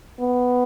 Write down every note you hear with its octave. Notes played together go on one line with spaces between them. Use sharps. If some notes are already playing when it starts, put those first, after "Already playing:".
B3